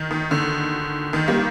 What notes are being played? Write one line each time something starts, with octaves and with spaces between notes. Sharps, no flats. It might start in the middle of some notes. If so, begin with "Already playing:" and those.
Already playing: D#3
D#3
D3
D#3
G3 A#3